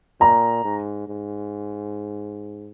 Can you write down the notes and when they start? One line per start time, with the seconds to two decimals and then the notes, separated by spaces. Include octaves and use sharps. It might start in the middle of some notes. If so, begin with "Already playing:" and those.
0.20 A#2 A#5
0.64 G#2
1.07 G#2